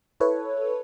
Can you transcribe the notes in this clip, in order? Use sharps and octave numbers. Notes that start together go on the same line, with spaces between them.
E4 A4 B4 C#5